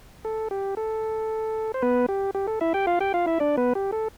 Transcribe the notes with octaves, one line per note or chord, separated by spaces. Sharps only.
A4
G4
A4
C5
B3 B4
G4
G4
A4
E4 E5
G4 G5
F4 F5
G4 G5
F4 F5
E4 E5
D4 D5
B3 B4
G4
A4